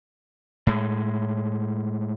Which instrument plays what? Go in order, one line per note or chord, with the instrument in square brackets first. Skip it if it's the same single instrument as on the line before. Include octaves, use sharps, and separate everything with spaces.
[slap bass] A2 G#3